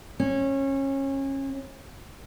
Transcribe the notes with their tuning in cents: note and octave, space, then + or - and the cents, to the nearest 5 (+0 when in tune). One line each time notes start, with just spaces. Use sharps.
C#4 -25